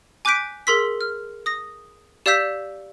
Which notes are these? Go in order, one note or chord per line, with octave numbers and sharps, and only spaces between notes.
G#5 D6 F#6 G6 B6 D7
G#4 A#4 C6 E6 B6
F6
D#6 A#6
G4 D5 F5 E6 G6 B6